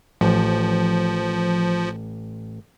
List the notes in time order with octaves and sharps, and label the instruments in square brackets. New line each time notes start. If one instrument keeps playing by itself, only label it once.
[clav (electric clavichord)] A1 [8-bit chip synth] F3